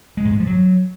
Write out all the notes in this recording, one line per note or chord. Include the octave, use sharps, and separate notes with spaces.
G#3
G#2
G#3
F3
F#3